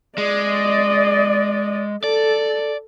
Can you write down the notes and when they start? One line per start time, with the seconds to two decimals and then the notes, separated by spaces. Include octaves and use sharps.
0.18 G#3 D5 D#5
2.04 A4 D5